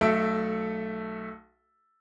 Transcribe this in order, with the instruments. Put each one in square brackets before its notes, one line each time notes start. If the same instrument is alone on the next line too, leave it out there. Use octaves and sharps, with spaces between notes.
[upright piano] B1 A3 A4 E5 D7